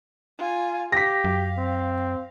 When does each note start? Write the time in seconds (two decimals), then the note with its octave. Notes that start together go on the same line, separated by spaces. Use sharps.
0.38 F4 G#5
0.92 G4 F5 A#6 B6
1.24 F#2
1.57 C4